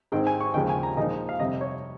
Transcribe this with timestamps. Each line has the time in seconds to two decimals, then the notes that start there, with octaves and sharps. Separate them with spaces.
0.12 G#2 D#3 G#3 C4 G5
0.27 G#5
0.40 C#6
0.54 D#2 C#3 F3 G#3 G5
0.69 G#5
0.83 A#5
0.97 A#2 F3 G#3 D#4 D#5
1.29 F5
1.39 F2 C3 G3 D#5
1.61 C#5